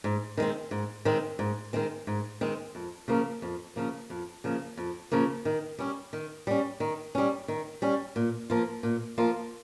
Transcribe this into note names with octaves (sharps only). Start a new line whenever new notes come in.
G#2
D#3 G#3 C4
G#2
D#3 G#3 C4
G#2
D#3 G#3 C4
G#2
D#3 G#3 C4
F2
C#3 F3 A#3
F2
C#3 F3 A#3
F2
C#3 F3 A#3
F2
C#3 F3 A#3
D#3
G3 C#4
D#3
G3 C#4
D#3
G3 C#4
D#3
G3 C#4
A#2
F3 A#3 F4
A#2
F3 A#3 F4